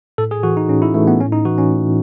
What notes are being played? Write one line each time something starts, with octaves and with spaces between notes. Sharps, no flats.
A2 A4
G#4
E3 F#4
D#4
A2 C#4
E4
E3 A3
B3
A2 C#4
D#4
E3 F#4
C#4
A2